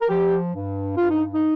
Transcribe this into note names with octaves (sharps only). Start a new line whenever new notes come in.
A#4
F3 G4
G2
G2 F4
D#4
D#4